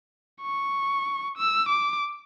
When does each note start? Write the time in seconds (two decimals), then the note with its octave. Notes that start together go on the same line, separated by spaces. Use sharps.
0.42 C#6
1.37 E6
1.69 D6